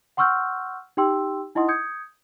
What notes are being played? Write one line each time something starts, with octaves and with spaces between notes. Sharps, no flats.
F#5 C6 C#6 E6 F6 G6
D#4 G4 G5 C6 E6
D#4 E4 D#5 F#5 C6 D#6
D#6 G6 G#6 C#7